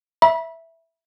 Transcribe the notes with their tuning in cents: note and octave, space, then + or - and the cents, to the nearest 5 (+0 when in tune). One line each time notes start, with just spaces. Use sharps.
E5 +0 B5 -40